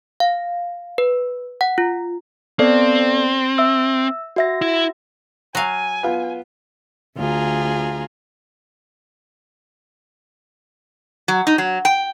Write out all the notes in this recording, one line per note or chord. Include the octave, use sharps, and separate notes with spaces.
F5
B4
F#5
F4
B3 C4 A4 D5
E5 E6
F#4 E5 A#6
E4
F#3 F5 G#5
B3 F4
D2 F4 G#4 A#5
F#3
D#4
F#3
G5